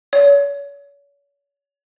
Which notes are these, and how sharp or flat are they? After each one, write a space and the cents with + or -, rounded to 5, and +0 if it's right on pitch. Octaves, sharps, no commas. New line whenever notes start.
C#5 +35